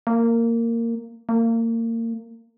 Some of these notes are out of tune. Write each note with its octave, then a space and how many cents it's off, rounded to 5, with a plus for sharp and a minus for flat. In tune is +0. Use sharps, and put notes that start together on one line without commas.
A#3 -15
A#3 -30